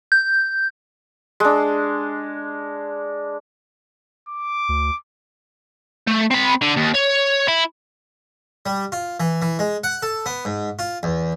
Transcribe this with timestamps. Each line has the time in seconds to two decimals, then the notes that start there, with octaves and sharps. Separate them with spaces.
0.12 G6
1.40 G#3 D4
4.29 D6
4.69 D2
6.07 A3
6.31 C4 B5
6.62 D3
6.77 D#2
6.95 C#5
7.48 E4
8.66 G3
8.92 F4
9.20 E3
9.42 E3
9.59 G#3
9.84 F#5
10.02 A4
10.26 B3
10.45 G#2
10.79 F4
11.03 E2